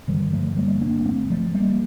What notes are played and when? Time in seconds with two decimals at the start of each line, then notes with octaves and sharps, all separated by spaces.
0.08 G2 D3 D#3 G3
0.32 F3 A3
0.57 G3 A#3
0.81 A#3 D4
1.05 A3 C4
1.30 F3 A3
1.54 G3 A#3